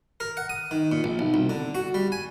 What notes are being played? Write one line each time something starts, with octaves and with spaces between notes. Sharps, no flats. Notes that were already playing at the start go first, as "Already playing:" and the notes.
A#4
F#5
D#6
D#3
A#2
A#1
B1
C2
D3
F#4
G3
G#5